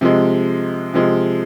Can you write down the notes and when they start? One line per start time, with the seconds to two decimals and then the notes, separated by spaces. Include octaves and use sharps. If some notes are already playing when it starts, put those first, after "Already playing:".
0.01 C3 F3 G#3
0.94 C3 F3 G#3